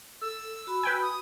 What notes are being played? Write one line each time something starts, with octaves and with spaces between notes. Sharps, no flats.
A4 E6
F#4 B5
B4 G5 G#5
D#6